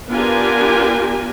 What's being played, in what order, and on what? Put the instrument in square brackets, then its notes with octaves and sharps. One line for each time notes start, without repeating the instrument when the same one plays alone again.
[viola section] B3 D4 F4 G4 A#4 G#5